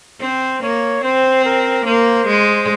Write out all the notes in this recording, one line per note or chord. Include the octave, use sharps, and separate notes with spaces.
C4 C5
A#3 C#5
C4 C5
A#4
A#3 C5
G#3